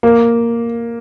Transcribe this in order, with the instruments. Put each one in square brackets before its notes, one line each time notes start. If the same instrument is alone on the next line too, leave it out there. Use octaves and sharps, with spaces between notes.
[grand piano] A#3